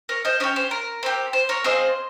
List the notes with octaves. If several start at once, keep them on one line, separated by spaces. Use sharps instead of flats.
A#4 C#5
C5 D#5
C#4 G4 A#4 C#5
C5
A#4
C4 G4
C5
A#4 C#5
C4 F4 G#4 C5 D#5